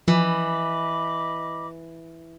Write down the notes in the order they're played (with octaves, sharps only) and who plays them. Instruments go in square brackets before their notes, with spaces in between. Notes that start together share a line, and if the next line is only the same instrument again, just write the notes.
[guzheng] E3 [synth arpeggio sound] F3 [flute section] D#5 B5 D6